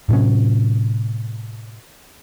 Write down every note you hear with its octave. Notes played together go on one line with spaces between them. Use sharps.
A2 C3 F#3 C#4